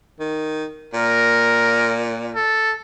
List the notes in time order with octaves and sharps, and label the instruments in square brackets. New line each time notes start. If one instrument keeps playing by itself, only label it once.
[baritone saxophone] D#3
[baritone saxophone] A#2 [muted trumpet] A#4
[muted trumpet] A4